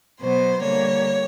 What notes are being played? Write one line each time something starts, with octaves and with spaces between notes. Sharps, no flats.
B2 F#3 B3 C5
D3 G3 A#3 C#5